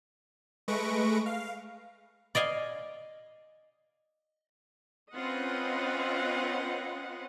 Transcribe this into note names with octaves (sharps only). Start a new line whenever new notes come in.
G#3 A3 B4 C#6 A#6 D7
F5
D5 D#5 F5 G#5
C4 C#4 F4 B4 D#5 F#5